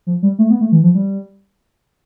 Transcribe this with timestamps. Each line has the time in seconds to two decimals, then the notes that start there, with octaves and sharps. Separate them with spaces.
0.07 F3
0.22 G3
0.39 A3
0.50 B3
0.61 A3
0.72 E3
0.83 F3
0.95 G3